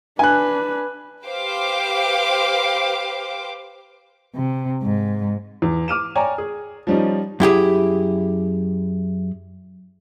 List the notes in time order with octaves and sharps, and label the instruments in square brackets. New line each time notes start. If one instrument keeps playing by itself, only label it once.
[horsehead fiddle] D4 B4 [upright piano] G#5 F#6
[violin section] G4 B4 C5 F5 G5 D6
[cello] C3
G#2
[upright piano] E2
D6 F6 D#7 E7
C#5 D5 G5 G#5 A#5
G#4
F3 G3 C#4 D#4
[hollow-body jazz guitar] F#2 E4 G4 G#4